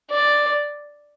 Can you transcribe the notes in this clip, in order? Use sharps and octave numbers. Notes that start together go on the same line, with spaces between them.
D5